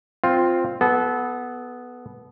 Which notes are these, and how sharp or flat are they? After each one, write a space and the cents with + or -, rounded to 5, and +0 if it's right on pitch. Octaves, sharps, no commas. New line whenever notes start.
C4 +0 F4 +5
B3 +0 A4 -30